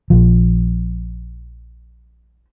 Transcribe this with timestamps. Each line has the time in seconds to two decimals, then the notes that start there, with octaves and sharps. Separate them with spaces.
0.10 A#1 F3